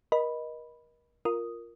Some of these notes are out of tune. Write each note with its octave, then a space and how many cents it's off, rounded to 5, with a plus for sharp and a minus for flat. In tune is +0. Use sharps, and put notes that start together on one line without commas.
A#4 +40 D#5 +0 B5 +0
F4 +0 A#4 +0 D#6 +0